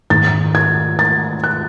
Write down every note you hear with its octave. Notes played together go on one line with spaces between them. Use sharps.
G#2 D#3 G#3 A6
G#6
A6
F#6